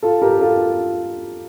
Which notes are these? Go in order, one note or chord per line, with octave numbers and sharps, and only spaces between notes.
F4 A4
G4 A#4
F4 A4